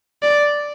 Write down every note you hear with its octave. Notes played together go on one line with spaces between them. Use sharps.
D5